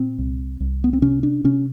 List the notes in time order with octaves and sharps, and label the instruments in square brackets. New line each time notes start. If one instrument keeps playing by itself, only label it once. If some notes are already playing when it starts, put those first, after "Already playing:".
Already playing: [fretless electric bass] A#2 C4
C2
C2
B3
C4
C3 C#4
D4
C3 C#4